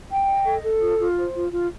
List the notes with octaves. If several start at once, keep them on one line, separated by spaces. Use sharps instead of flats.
G5
D#5
A4
A4
F4
F4
C5
F4
F4